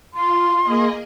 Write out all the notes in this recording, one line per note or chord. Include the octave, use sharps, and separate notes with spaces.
F4 C6
A#3 G#4 D#5